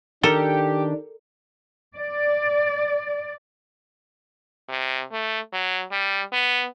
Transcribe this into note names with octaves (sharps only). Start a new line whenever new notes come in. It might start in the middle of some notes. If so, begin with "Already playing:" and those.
D#3 D4 G4 A4 A#4 D5 A#5
D5
C3
A3
F#3
G3
B3